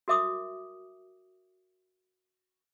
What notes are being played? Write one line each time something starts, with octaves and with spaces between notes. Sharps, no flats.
F#4 A#4 E5 D6 D#6